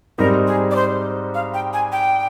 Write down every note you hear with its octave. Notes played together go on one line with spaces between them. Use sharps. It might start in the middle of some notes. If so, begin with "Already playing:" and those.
G#2 G3 C4 D#4 A#4
G#4
D5
C5
F5
G5
G#5
G5